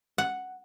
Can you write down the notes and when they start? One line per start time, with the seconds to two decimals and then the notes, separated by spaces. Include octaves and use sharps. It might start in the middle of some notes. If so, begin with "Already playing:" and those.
0.18 F#5